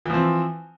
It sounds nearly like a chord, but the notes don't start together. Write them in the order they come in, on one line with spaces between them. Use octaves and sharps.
E3 F3 C4